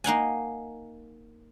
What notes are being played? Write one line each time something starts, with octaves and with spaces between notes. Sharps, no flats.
A#3 D#4 F#5 G#5